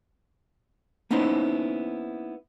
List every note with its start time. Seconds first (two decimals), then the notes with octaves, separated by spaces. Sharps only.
1.11 A#3 B3 C#4 D#4 E4 C5